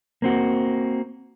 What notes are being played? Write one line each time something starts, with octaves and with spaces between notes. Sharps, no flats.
A#3 C4 F#4